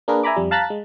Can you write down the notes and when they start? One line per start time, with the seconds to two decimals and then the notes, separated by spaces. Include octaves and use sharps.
0.08 A#3 D4 G#4 A#4 B4
0.23 E5 G#5 A#5 B5 D6
0.37 F2 G3
0.51 F5 A5 A#5 F#6 A6 B6
0.70 G#3